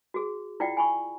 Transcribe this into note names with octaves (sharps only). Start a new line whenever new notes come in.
F#4 G#4
E4 F4 D5 F#5 G5
G#5 B5 C#6